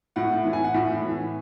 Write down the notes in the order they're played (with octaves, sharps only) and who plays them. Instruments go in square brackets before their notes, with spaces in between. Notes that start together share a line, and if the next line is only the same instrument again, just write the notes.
[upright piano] A2 F#5
E3
G#5
F#5
A2 E5
E3